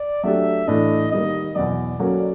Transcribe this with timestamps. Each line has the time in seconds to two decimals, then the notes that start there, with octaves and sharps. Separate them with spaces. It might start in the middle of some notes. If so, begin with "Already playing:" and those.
Already playing: D5
0.23 F#3 A3 D4 G4 E5
0.67 A2 E3 A3 D4 D#5
1.12 D#3 G3 A#3 D#5
1.56 E2 B2 F#3 D5
1.99 F#3 A#3 C#4 F#4 A4